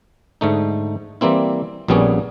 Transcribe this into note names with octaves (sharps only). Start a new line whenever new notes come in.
G#2 D3 A3 D#4
E3 G3 A#3 C4 E4
A#1 A#2 G3 B3 C#4 G#4